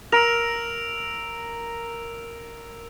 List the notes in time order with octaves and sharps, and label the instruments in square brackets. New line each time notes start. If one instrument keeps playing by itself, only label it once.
[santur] A#4 [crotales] E6 D7 F7